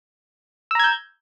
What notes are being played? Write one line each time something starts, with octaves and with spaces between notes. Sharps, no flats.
A#5 E6 G6 G#6